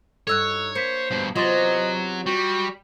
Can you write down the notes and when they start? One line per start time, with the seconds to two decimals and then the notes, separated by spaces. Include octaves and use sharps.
0.27 G2 D#4 F#4 A4 C#5 E6 F#6
0.75 A#3 C5 B6 C#7
1.11 G2 B2
1.36 C3 E3 F#3 B3 F4 D#5 C6 A6
2.26 G3 F#4